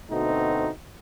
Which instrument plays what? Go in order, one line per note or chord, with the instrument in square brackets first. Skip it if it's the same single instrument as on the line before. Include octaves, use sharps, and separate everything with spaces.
[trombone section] D2 B2 A3 C4 D#4 F#4